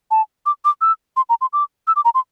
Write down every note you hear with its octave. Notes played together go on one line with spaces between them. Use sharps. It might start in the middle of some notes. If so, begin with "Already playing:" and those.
A5
D6
D6
E6
C6
A#5
C6
D6
E6
D6
A#5
C6